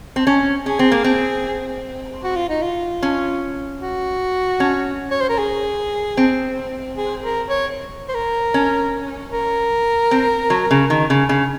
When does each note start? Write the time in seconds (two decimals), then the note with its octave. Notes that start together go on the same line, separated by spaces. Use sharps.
0.16 C4
0.27 C#4
0.66 C#4 G#4
0.79 C4
0.92 A#3
1.04 C4
2.24 F#4
2.36 F4
2.49 D#4
2.62 F4
3.02 C#4
3.81 F#4
4.60 C#4
5.11 C#5
5.20 C5
5.30 A#4
5.39 G#4
6.17 C4
6.96 G#4
7.23 A#4
7.49 C#5
8.09 C5
8.14 A#4
8.54 C#4
9.33 A#4
10.11 C4
10.50 F#3
10.71 C#3
10.90 D#3
11.10 C#3
11.29 C#3